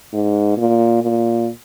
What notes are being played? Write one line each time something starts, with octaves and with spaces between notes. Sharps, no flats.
G#2
A#2
A#2